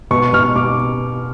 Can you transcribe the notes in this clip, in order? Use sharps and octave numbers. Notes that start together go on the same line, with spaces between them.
B2 C#6
B2 F6
B2 D6